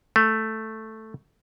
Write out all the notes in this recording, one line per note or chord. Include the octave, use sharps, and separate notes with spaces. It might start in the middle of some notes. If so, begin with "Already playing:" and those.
A3